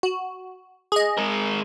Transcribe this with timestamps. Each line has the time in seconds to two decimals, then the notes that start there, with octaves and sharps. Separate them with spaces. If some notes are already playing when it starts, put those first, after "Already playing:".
0.03 F#4
0.92 G#4 D#5
1.18 G#3 A#4